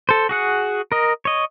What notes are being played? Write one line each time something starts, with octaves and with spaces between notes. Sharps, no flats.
A4 C5
F#4 G#4 F#5
A#4 D#5
C#5 D#5